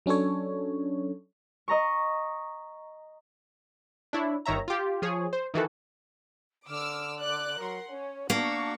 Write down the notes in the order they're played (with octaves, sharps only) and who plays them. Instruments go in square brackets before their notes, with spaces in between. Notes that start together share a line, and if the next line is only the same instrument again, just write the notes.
[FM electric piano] F#3 C#4 D4 A4 C#5
[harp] D#5 A#5 C#6
[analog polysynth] D4 E4 C#5
G1 D#3 C#5 E5 A#5
F4 G4
F3 G#4 C#5
C5
D#3 E3 F#4 A4
[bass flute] D3 [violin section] D6 E6 F6
[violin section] D5 D6 F#6
[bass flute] F#3 [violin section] A#4 F#5 C6
[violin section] C#4 [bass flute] C#5
[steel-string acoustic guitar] A#3 [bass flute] D4 [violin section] F#4 A5 C#6